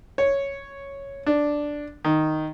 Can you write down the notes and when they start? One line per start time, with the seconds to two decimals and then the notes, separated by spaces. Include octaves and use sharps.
0.18 C#5
1.26 D4
2.05 D#3